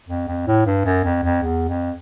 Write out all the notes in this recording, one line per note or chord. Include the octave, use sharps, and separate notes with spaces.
F2
F2
A2
G2
F#2
F2
F2
E2
F2